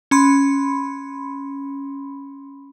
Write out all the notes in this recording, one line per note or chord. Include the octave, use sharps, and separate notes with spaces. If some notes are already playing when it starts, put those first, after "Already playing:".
C#4 B5 C6